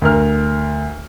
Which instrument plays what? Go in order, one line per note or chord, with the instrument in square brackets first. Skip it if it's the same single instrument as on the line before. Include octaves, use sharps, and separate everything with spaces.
[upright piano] D2 A#4 F6